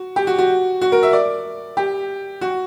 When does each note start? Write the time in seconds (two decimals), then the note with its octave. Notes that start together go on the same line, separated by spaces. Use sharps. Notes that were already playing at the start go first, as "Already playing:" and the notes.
Already playing: F#4
0.16 G4
0.27 F#4
0.38 F#4
0.81 F#4
0.92 A#4
1.03 E5
1.13 D5
1.77 G4
2.41 F#4